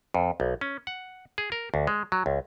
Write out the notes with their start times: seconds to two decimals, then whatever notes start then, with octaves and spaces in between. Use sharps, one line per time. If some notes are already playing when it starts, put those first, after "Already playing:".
0.14 F2
0.40 B1
0.61 C#4
0.87 F#5
1.38 G#4
1.52 A#4
1.74 D2
1.87 G#3
2.12 F#3
2.26 C#2